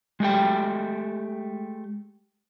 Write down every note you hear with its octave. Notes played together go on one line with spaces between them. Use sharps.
G#3 A3 G4 G5